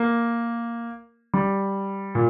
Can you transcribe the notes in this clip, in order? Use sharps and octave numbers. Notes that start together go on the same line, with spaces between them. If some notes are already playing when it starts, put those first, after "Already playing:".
Already playing: A#3
G3
A#2